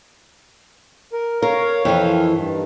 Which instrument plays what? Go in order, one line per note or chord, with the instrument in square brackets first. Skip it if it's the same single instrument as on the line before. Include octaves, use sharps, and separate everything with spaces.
[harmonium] A#4
[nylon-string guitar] A#4 [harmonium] C#5 F5
[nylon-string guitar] F2 E3
[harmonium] G2 D#3